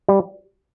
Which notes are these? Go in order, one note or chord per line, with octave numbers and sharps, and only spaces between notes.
G3